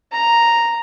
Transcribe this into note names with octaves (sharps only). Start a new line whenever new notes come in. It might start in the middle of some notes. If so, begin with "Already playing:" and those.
A#5